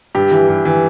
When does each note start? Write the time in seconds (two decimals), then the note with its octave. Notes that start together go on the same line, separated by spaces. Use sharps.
0.15 G2 G4
0.31 E3
0.48 G2
0.65 E3